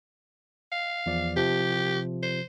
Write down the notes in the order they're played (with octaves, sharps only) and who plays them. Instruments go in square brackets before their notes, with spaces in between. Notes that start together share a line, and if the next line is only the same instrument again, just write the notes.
[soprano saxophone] F5
[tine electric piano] E2 F3 D5
[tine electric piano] C3 F3 [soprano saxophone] G4
[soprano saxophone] C5